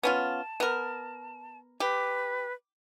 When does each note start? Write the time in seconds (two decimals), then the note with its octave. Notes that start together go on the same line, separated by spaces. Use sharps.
0.03 B3 C#4 F4 A5
0.60 B3 A#4
1.80 G4 B4